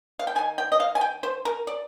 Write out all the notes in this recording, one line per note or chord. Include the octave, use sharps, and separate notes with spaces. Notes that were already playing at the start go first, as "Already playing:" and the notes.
F5
G5
D#3 A#3 G#5
G5
D#5
F5
G#5
G5
C5
A#4
D5